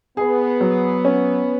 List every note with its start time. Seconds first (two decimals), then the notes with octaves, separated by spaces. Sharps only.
0.17 B3 G#4
0.61 F#3
1.05 C#4